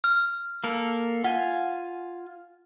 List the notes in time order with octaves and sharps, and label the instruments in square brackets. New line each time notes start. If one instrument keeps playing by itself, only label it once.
[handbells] F6
[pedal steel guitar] A#3 A4 A#4
[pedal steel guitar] F4 G#5 [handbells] F#5